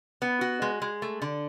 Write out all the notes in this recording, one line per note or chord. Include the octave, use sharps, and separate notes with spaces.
B3
F#4
G#3
G#3
A3
D3